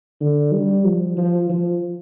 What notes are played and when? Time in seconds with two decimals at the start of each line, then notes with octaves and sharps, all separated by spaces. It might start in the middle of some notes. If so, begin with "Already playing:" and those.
0.21 D3
0.53 G3
0.85 F3
1.17 F3
1.49 F3